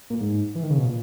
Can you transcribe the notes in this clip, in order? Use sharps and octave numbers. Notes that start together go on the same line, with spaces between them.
A#2
G#2
E3
D#3
C#3
B2
A#2